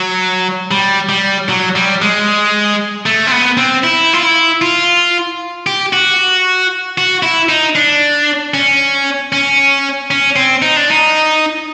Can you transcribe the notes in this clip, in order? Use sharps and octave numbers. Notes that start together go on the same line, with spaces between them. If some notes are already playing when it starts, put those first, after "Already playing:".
Already playing: F#3
G3
G3
F#3
G3
G#3
A3
C4
B3
C4
E4
F4
E4
F4
G4
F#4
F#4
E4
D#4
D4
C#4
C#4
C#4
C4
D#4
D4
D#4